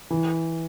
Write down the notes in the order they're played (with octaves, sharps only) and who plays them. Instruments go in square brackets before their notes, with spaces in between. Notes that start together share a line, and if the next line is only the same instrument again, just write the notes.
[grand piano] E3